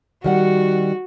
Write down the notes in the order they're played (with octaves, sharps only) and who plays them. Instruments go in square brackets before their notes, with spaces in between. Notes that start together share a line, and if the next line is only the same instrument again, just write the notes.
[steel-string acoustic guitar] D#3 G3 F#5 [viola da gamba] F#4